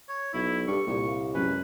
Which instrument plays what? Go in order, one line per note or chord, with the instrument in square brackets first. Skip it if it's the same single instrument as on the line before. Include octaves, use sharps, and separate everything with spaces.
[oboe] C#5
[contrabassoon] B1 [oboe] E4
[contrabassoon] G2 [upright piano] D4 G4 A4 [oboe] C#6
[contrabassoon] C2 [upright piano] A#2
[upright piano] F5
[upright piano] F#2 G#3 C#4 [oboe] B4